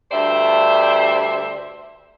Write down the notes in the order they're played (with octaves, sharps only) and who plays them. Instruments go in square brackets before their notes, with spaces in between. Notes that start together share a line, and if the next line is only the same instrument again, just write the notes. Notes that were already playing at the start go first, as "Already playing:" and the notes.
[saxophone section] D2 G2 C5 D5 E5